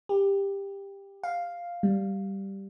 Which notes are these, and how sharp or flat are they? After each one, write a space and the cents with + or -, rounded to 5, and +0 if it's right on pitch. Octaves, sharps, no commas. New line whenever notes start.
G4 +15
F5 +0
G3 -5